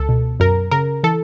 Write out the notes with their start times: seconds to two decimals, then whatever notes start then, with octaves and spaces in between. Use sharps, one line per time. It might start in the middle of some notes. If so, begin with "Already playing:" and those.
Already playing: C#2 A4
0.09 B2
0.40 F#2 A#4
0.71 C#3 A#4
1.03 E3 A4